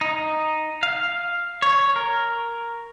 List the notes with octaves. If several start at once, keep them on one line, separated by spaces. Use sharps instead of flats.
D#4
F5
C#5
A#4